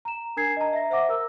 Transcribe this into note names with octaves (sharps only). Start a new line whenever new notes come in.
A#5 E7
D4 A#4 G#5 G#6 C7
D#5 A5 A#5
E5 A#6
C5 E5 F#5 D6 A#6
A#4 A#5 E6